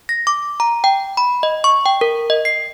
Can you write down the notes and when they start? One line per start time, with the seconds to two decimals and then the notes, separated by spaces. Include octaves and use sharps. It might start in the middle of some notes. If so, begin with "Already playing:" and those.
0.09 A#6
0.27 D6
0.60 A#5
0.84 G5
1.17 B5
1.43 D#5
1.64 C#6
1.86 G5
2.01 A#4
2.30 D#5
2.45 C7